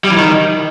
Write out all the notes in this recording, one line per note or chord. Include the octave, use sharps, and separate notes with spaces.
G3
E3
D#3